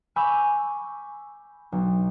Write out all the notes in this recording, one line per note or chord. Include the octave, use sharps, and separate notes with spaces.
G#5 B5 C#6 D6 E6 G6
B1